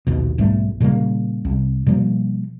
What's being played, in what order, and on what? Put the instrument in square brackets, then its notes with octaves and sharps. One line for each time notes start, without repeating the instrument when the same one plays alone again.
[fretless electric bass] A#1 D#2 B2
B1 G#2 G3 A3
A#2 C#3 G3 A#3
C2
B2 F3 G3 A#3